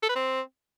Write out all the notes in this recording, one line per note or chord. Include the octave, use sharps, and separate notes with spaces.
A4
B4
C4